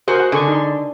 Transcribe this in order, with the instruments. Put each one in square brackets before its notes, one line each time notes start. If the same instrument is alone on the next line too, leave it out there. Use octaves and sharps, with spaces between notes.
[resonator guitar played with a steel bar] F#4 C5 [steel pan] G#4 A#4
[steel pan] F#5
[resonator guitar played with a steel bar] D3 [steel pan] G#4 C#6
[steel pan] D#4 C6